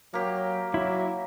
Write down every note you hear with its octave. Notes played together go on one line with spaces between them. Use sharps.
F#3 A#3 G4
F#3 E4